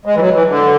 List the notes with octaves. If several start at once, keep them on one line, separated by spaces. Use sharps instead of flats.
G#3
E3
F#3
E3
D3